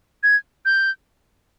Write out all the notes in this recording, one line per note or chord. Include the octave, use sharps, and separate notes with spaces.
G#6
G6